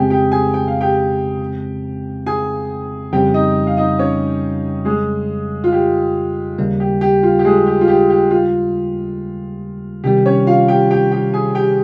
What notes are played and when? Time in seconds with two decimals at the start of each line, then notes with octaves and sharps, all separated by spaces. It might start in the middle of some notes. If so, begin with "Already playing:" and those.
Already playing: F2 C#3 G#3 C4 G4 G#4 G5 G#5
0.10 G4 G5
0.32 G#4 G#5
0.54 G5
0.67 F5
0.81 G4 G5
2.26 G#4 G#5
3.13 F2 C#3 G3 G4 G5
3.34 D#4 D#5
3.67 F5
3.77 D#4 D#5
3.99 C#4 C#5
4.85 G#3 G#4
5.64 F4
5.72 G4
6.59 D#2 C#3 G3 A#3
6.80 G4
7.01 G4
7.23 F4
7.39 G4
7.45 G#3 G#4
7.66 G4
7.81 F4
7.88 G4
8.10 G4
8.31 F4
10.04 C3 D#3 G3 G4
10.26 C#4 C#5
10.47 F4 F5
10.68 G4 G5
10.91 G4 G5
11.12 G4 G5
11.33 G#4 G#5
11.55 G4 G5